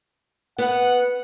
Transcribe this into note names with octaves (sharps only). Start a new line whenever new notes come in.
B3 F#5